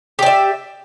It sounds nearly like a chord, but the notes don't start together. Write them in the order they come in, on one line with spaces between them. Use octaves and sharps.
G4 D5 E5